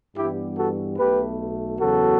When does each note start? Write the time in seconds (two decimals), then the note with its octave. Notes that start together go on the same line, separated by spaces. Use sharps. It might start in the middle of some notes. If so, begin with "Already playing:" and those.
0.16 G2 E3 G3 B3 E4 G4
0.57 F#4 A4
0.98 B1 B2 A3 G4 B4
1.80 E2 C#3 F#3 B3 F#4 A4